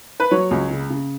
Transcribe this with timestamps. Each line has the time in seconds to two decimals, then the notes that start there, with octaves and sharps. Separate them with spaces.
0.20 B4
0.31 F#3 C#5
0.51 C#2
0.71 C#3
0.90 C#3